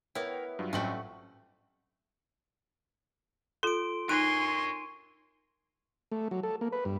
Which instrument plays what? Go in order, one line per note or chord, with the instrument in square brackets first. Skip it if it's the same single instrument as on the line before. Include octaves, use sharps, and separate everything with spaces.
[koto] B3 E4 [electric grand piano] A#4 C#5 G5
[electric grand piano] G2 F#3 F4
[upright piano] A1 G5 F#7 [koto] A3 C4 F#4
[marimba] F4 A4 [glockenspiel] C6 D7
[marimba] D#4 F#6 [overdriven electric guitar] A#4 C#5 [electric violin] G#5 C6 [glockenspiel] D#7
[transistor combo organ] A3
F#3
A4
A#3
B4
G2